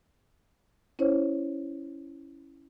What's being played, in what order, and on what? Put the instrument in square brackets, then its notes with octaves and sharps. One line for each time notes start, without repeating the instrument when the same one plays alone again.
[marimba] C#4 E4 C5 C#5